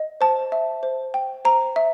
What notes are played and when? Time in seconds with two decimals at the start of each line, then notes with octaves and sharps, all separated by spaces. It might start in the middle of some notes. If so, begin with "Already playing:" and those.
Already playing: D#5
0.21 C5 A5
0.52 E5
0.83 C5
1.14 G5
1.45 C5 A#5
1.76 E5